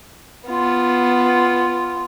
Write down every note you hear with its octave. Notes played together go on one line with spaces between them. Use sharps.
B3 F4